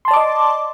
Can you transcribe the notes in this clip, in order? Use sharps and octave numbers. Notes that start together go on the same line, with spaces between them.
D5 D#5 A5 C6 D6